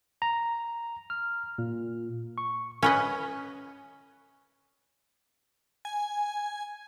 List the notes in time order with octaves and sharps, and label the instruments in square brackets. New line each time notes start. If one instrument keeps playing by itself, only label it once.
[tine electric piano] A#5
F6
A#2
C#6
[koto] C#4 B4 D#5
[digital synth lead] G#5